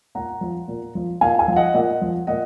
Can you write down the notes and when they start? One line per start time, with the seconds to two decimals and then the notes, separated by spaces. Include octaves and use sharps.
0.15 A#2 F#5 A#5
0.41 F3
0.68 A#2
0.95 F3
1.21 A#2 F5 G#5
1.39 F5 G#5
1.48 F3
1.56 D#5 F#5
1.74 A#2 D#5 F#5
2.01 F3
2.27 A#2 D#5 F#5